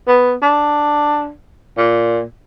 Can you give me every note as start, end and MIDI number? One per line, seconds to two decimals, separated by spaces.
0.07 0.34 59
0.42 1.30 62
1.78 2.22 46